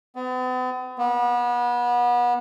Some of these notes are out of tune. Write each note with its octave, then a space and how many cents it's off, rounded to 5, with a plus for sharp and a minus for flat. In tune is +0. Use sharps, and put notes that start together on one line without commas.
B3 +45
B3 -30